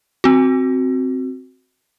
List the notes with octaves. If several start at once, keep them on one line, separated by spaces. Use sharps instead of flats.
C4 F#4